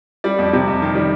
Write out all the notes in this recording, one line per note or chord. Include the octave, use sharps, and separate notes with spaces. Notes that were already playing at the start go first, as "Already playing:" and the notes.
G3 D5
F2
C3
F2
D#3
G3